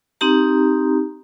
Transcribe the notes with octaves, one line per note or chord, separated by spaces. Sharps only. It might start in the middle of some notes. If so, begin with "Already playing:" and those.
C4 D#4 G4 A#5